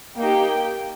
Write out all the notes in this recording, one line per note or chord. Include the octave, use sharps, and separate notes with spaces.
A#3 D#4 G4 G5